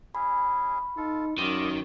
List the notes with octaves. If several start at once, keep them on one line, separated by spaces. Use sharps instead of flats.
C#4 E4 G#4 B5
D#4 F4 A4
F#2 D#3 F4 D5 D#5